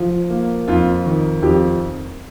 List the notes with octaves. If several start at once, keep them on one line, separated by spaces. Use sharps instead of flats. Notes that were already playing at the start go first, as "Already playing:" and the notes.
Already playing: F3
A#3
F2 F4
D#3
F2 G4